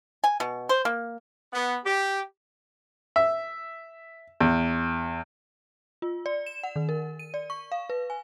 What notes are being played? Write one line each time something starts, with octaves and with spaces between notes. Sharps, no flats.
G#5
B2
C5
A#3
B3
G4
E5
E2
F4
D5
E7
F#5
D#3
A#4
D#7
D5
C#6
F5
B4
G#5